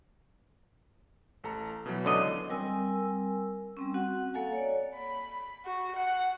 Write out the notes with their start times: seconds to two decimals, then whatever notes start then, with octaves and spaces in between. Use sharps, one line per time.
1.44 A1 A4 A#5
1.86 B2 E3 F#3
2.05 C#2 D3 D#5
2.49 G3 C4 A#4 G#5 E6
3.77 G3 C4 C#4
3.94 C4 F#4 F#5
4.34 A#3 A4 F5 F#5 G#5
4.53 C#5 D5
4.95 B5
5.65 F#4
5.96 F#5